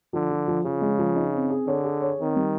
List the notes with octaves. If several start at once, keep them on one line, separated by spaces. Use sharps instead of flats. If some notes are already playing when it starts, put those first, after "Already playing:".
D3 F3
F3
F3
C#3 F3
G#3
F3
D#4
C4
G#4
D3 C#5
G#4
C#5
D#3 C4
G3